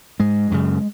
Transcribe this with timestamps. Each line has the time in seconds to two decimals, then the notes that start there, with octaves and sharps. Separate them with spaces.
0.19 G#2 G#3
0.51 F#2 C#3